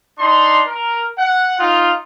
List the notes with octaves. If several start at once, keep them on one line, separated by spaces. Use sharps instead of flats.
D4 D#4 C6
A#4
F#5
D#4 F4